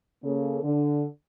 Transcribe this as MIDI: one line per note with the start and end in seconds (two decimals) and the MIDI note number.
0.24 0.60 49
0.24 0.60 58
0.24 0.60 69
0.63 1.05 50